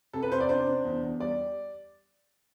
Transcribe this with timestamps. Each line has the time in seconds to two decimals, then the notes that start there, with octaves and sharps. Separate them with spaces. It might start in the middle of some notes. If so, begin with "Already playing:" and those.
0.13 C3 A4
0.23 B4
0.32 C3 C5
0.40 D5
0.49 D4 C5
0.67 D4
0.85 E2
1.03 E2
1.20 G3 D5